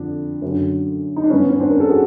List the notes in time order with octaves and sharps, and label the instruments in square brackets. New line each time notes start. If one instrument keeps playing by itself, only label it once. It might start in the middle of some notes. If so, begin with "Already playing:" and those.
Already playing: [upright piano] F2 D3 D4
F#2 D3
D#4
D4
G2 D#3 B3 C#4
C#4
C4 D4
A#4
A4
F#4 G#4